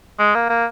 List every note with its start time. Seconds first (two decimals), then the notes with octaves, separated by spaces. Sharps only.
0.19 G#3
0.35 A#3
0.49 A#3